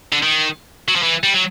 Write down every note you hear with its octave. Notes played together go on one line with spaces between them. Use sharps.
D3
D#3
F#3
F3
E3
G3
F#3